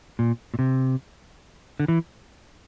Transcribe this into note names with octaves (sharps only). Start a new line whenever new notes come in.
A#2
A#2
C3
D3
E3